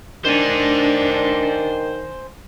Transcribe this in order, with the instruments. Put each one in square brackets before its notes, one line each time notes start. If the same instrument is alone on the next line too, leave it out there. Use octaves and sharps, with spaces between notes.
[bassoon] D#3 [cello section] D4 [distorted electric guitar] C5 G#5